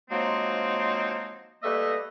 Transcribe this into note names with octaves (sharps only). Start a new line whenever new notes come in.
F3 F#3 G#3 A#3 C4 D#4
G3 A3 A#3 B4 D#5 E5